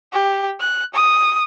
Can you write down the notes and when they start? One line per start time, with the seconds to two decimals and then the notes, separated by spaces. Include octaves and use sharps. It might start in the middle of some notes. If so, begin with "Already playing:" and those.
0.12 G4
0.60 F#6
0.94 D#6